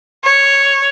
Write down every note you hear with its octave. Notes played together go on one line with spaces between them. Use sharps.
C#5